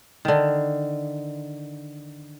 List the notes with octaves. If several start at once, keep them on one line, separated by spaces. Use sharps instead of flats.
D3 D#3